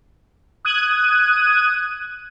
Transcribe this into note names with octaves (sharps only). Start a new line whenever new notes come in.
D#6 F#6 G#6 D#7